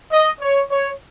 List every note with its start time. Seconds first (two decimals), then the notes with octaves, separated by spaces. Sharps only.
0.11 D#5
0.41 C#5
0.70 C#5